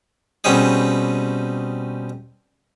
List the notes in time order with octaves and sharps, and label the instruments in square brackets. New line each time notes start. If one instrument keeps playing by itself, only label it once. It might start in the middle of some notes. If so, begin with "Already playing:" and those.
[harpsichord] B2 G3 C4 C#4 D#4 G#4